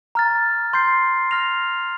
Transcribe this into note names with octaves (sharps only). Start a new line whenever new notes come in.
A#5 F6 A6
C6 G6 C7
C6 F6 A#6 F7